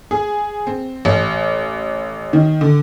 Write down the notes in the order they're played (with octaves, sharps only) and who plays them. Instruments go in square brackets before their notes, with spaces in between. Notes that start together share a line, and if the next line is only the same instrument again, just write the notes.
[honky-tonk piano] G#4
C4
A1
D#3
D3